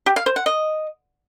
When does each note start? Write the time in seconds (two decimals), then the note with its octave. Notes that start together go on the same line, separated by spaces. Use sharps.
0.06 G4
0.16 F5
0.26 C5
0.36 F#5
0.46 D#5